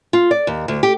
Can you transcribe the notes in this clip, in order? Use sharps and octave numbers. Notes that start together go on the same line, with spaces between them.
F4
D5
D#2
D2
G4